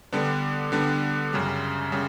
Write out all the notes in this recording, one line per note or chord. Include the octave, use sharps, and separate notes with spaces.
D3 G3 B3 D4
D3 G3 B3 D4
F#2 C#3 G3
C#3 G3